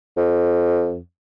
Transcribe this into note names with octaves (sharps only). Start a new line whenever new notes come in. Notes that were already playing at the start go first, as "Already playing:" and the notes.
F2